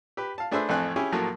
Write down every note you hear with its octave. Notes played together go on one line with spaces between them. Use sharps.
G4 B4
F5 A5
A3 D4 G#4 B4 C5 E5
A1 F2 A3 C4 G#5 F#6
C#4 E4 G4 G#4
A2 F3 F#3 A3 A#3